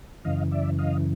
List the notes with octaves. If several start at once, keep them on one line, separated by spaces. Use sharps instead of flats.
F#2 C#3 E3 D#5 F5
D5 E5
D#5 F5